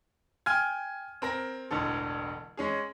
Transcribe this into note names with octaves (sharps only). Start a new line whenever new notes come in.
G5 G#5 F6 G#6
C4 A#4 A#6
E1 A1 D3 A4
G#3 C#4 G#4